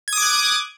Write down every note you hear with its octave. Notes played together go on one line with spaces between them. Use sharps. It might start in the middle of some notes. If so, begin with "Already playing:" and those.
D6 D#6 F#6 G#6